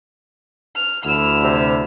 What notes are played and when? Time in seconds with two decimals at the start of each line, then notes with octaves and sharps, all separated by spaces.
0.75 F6
1.05 D2 D3 E4 F6 E7
1.43 C3